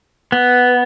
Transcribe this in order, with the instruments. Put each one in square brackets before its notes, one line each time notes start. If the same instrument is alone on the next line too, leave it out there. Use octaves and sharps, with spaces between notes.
[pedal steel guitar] B3